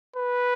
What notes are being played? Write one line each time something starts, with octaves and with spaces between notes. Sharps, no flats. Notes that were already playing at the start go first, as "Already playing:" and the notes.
B4